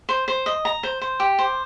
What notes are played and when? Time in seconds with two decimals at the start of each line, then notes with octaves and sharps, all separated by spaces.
0.09 C5
0.28 C5
0.46 D#5
0.65 A#5
0.83 C5
1.01 C5
1.20 G4
1.39 C5